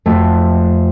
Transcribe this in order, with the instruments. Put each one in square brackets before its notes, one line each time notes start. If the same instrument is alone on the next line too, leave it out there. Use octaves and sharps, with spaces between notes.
[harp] F2 A3 F#4